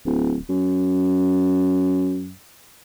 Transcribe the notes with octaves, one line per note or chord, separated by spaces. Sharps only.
D1
F#2